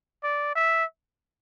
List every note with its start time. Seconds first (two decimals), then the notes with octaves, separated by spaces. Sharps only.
0.24 D5
0.55 E5